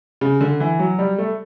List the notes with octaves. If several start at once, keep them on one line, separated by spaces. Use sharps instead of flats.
C#3
D3
E3
F#3
G3
A3